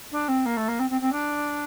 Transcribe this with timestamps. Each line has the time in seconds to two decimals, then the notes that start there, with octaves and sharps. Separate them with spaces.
0.12 D4
0.28 C4
0.46 A#3
0.57 A3
0.68 A#3
0.79 C4
0.90 C4
1.01 C4
1.12 D4